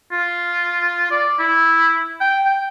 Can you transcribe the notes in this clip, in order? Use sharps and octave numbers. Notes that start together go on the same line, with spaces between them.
F4
D5
E4
G5
G5